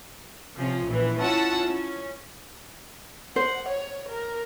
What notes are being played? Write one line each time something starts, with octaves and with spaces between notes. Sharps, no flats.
C3 F3 C#4
A#1 E3
C#4 E4 F4 F#5 A5 E6
C#4
C5 F#5
C#5
A#4